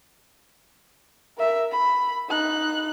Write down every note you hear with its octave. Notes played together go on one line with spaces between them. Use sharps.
A#4 E5
B5
D#4 F#6